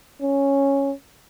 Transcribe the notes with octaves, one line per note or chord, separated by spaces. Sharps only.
C#4